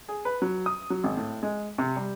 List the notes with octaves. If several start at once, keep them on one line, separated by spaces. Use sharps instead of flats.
G#4
B4
F#3
D#6
F#3
G#1
A2
G#3
C3
G3